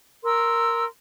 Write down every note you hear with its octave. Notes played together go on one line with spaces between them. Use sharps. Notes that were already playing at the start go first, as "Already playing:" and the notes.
A#4 C6 E6